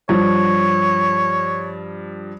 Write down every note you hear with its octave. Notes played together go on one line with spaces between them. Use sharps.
G2 F3 C#5